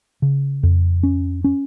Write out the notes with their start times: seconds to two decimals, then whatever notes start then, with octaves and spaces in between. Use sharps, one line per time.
0.22 C#3
0.63 F2
1.03 C#4
1.44 C#4